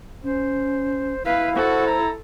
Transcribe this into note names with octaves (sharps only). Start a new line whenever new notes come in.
C#4 C5
E4 B4 F5
F#4 A4 C5
A#5